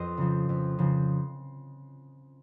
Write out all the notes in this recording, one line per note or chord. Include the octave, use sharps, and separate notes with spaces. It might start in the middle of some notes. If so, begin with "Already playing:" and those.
Already playing: F2 C5 D#5
C#3 F3
F2
C#3 F3